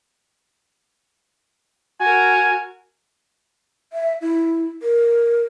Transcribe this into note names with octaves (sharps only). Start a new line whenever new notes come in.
F#4 A#4 G#5
E5
E4
A#4